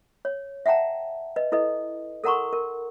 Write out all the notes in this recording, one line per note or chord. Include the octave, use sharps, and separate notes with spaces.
C#5
E5 F#5 G5 A5 A#5
B4 D#5
E4 A4 B4 D#5
A4 A#4 F#5 A#5 C6 C#6
A#4